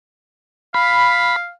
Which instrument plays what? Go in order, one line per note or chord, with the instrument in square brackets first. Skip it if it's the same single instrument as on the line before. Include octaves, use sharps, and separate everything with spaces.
[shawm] F5 [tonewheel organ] B5